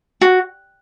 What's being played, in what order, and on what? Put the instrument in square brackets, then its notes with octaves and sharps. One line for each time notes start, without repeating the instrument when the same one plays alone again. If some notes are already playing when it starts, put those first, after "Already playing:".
[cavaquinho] F#4